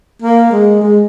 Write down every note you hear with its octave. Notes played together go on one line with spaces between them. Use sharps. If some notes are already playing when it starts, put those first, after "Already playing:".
A#3
G#3
G#3